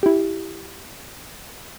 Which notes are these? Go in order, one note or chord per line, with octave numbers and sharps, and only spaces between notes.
E4 G4